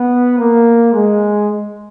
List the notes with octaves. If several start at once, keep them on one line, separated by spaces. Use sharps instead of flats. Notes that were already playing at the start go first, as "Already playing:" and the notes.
Already playing: B3
A#3
G#3